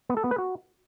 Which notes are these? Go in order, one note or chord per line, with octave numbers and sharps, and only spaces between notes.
B3
A4
B3
B4
F#4